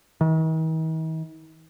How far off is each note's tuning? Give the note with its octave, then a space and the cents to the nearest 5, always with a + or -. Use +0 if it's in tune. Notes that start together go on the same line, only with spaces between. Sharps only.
D#3 +45